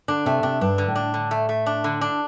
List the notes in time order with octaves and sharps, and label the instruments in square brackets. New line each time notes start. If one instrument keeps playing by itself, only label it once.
[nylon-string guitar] D3 [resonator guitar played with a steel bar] D4
[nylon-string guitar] C3 [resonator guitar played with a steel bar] A3
[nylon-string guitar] C3 [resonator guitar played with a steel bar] D4
[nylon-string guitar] G2 [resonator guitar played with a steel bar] D4
[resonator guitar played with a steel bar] D3
[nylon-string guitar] A2
[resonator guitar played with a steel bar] D4
D3
A3
A3
D4
D3
D4